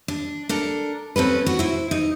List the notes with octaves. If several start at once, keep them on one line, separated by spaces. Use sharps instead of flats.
D4
D4 A4 A#4
C4 C#4 A4 B4
F#4
E4 C5
D#4